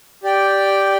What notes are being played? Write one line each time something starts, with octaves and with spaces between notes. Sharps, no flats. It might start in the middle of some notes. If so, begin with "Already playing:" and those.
G4 D5 G5